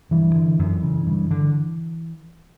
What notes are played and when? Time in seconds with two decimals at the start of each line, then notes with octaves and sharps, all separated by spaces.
0.11 G2 E3
0.36 D3
0.59 F#2
0.83 C#3
1.07 G2
1.31 D3